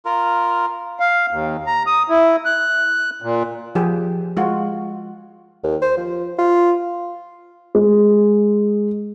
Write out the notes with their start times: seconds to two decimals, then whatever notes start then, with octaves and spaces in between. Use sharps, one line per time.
0.05 F4 A#4
0.99 F5
1.31 D#2
1.67 A#5
1.87 D#6
2.09 E4
2.45 F#6
3.22 A#2
3.75 F3 G4 G#4
4.37 G#3 F4 F#4
5.64 D#2
5.82 C5
5.97 F3
6.38 F4
7.75 G#3